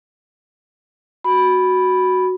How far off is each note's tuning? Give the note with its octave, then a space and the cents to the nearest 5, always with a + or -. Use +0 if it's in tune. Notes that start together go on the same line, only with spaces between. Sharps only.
F#4 +0 B5 +0